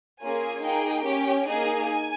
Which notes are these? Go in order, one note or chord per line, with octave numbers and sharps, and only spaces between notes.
A#3 C#4 F4 G#4 G#5
A#3 D#4 G#4 G5
C#4 G4
A#3 D#4 G#4 G#5